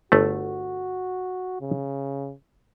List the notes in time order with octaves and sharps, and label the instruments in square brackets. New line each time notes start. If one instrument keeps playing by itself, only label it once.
[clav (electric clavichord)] G1 A3 [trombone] F#4
[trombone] C#3